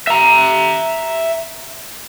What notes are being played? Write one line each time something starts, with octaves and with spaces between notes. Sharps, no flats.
E5 A#5